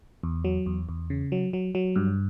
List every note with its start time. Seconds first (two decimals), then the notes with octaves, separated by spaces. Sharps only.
0.23 E2
0.45 F#3
0.66 E2
0.89 E2
1.10 C#3
1.32 F#3
1.53 F#3
1.75 F#3
1.96 G2